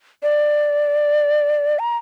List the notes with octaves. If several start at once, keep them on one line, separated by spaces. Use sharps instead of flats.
D5
A#5